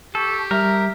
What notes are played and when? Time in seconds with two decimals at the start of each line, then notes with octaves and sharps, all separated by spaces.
0.15 G4 A4 C#6
0.51 G3 A#4 E5